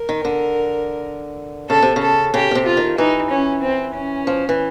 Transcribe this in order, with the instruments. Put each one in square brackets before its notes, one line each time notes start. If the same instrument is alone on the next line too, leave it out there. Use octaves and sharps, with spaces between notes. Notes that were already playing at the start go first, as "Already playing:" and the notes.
Already playing: [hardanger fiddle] A#4
[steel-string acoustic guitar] D#3
D3
[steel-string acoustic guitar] C#3 [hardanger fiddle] A4
[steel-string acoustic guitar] C3
C#3
[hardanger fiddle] A4
[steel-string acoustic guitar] C#3 [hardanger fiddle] G4
[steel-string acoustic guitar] C#3
C3
[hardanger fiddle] F4
[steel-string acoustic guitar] D#3
[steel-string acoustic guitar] E3 [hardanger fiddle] D#4
[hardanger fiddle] C#4
C4
C#4
[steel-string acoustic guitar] F3
E3